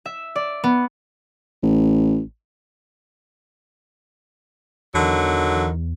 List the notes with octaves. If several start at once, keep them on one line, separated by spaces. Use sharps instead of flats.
E5
D5
B3
A1
E2 D3 D#3 F#3